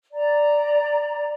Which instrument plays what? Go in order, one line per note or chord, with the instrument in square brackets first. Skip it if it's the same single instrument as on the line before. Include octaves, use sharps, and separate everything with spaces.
[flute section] D5 A#5